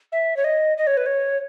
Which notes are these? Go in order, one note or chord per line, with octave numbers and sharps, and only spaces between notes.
E5
C#5
D#5
D#5
C#5
B4
C#5